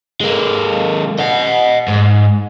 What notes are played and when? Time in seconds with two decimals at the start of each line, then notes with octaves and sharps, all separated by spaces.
0.21 G#3 A#3
1.19 D#5 F#5
1.88 G#2